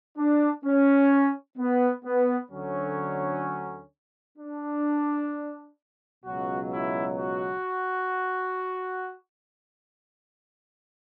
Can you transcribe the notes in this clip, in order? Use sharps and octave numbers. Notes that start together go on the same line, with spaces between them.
D4
C#4
B3
B3
D2 D3 F#3 C#4
D4
C#2 B2 F#3 F#4
E4
F#4